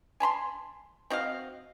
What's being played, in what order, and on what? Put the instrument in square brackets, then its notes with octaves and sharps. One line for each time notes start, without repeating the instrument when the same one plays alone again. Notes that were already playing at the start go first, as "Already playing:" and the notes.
[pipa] G#5 A5 B5 C6
C4 F#4 D#5 F5